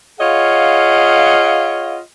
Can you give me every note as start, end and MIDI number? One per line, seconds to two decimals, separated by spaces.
0.20 2.00 65
0.20 2.00 68
0.20 2.00 73
0.20 2.00 75
0.20 2.00 77
0.20 2.00 78